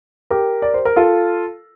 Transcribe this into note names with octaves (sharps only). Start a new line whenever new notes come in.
G4 A#4
D5
C5
A#4
F4 A4